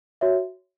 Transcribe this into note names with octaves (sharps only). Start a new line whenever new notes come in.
F#4 C#5 E5